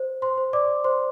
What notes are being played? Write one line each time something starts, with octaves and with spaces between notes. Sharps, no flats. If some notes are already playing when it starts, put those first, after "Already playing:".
Already playing: C5
C5 C6
C5
D5 D6
C5 C6